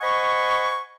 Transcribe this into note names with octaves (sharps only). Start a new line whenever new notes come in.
C5 D#5 F#5 G#5 B5 C#6